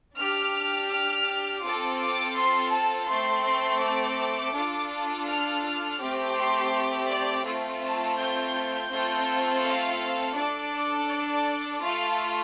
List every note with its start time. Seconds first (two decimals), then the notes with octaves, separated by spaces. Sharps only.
0.18 D4 G4 F6
0.90 F6
1.63 C4 F4 A4 D6
1.99 D6
2.36 C6
2.72 A5
3.09 A3 C4 A4 C6
3.82 D6
4.54 D4 F4 A4
5.27 F6
5.63 F6
5.99 A3 C4 G4
6.36 C6
7.09 D5
7.45 A3 C4 F4 A4
7.82 A5
8.18 G6
8.90 A3 C4 F4 A4
9.64 F5
10.36 D4 A4 D5
11.09 D5
11.81 A3 F4 A4 F5